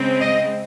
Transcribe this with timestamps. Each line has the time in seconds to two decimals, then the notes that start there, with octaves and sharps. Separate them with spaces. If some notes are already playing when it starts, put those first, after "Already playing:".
Already playing: C#3 G#3 C4
0.21 D#5